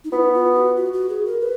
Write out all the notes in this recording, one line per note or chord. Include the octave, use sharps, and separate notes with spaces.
D#4
B3 E4 F4
F4
F#4
F#4
F#4
G#4
A#4
B4